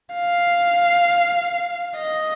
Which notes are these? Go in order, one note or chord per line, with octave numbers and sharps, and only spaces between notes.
F5
D#5